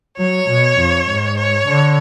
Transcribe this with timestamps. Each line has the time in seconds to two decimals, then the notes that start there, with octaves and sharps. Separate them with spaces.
0.18 F#3 C#5
0.49 B2
0.77 F2
1.08 G#2
1.37 C#5
1.68 D3